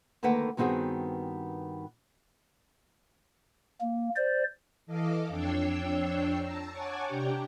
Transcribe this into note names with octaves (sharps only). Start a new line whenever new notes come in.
D2 D#3 A#3 A4 B4 F#5
G2 D#3 B3 C4 F#4 G#4
A#3
C5 D5
E3 A4 D#5 F5 D6
F2 D4 C#5 G5 E6 C7
A5 A#5 E6
C#5 F#5 G#5 A5 C#6 D6
C3 D4 G4 G5 A#5